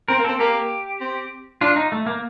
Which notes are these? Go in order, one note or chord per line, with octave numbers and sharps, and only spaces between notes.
C4 A#4
A#3
C4 A4
A#3 G4
C4
D4 F4
D#4
A3
A#3